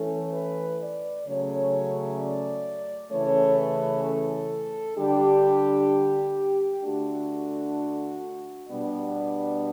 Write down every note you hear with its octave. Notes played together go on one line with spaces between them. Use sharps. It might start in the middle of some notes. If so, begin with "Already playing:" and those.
Already playing: E3 A3 C#4 A4
B4
D5
C#3 F#3 A3 C#4 C#5
D5
C#3 E3 A3 C#4 C#5
B4
A4
D3 G3 D4 G4
D3 A3 D4 F#4
B2 G3 B3 D4 D5